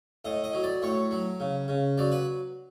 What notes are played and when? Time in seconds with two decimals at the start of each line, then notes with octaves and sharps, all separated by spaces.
0.25 A2 D#5
0.44 D#5
0.53 F#3
0.63 D5
0.82 A2 C#5
1.11 F#3
1.40 C#3
1.68 C#3
1.98 F#3 D5
2.12 B4